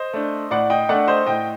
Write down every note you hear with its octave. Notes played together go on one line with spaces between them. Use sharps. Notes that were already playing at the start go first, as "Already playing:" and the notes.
Already playing: C5 D#5
A3 D4
A2 D5 F#5
D#5 G5
A3 D4 D5 F#5
C5 D#5
A2 D#5 G5